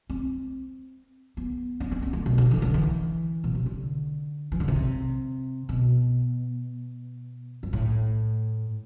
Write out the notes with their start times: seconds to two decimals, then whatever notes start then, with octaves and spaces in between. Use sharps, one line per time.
0.10 C4
1.37 B3
1.80 D4
1.91 C4
2.02 B3
2.13 A3
2.26 B2
2.38 D3
2.51 E3
2.62 D3
2.74 E3
3.44 B2
3.55 C3
3.66 D3
4.52 E3
4.60 D3
4.68 C3
5.69 B2
7.63 G2
7.73 A2